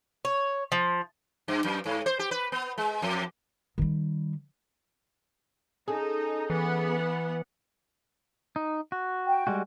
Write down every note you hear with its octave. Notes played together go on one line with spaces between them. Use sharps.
C#5
F3
G2
F#2
G#2
C5
G4
B4
B3
G#3
F2
D#3 G3
C#4 D#4 G#4 A4
E3 B3 F#5
D#4
F#4
G5
G3 G#3 F#4